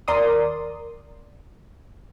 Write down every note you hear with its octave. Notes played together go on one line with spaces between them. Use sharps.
D#2 A#4 D5 C6 D#6